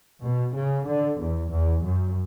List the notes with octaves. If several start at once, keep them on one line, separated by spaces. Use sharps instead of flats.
B2
C#3
D3
E2
E2
F#2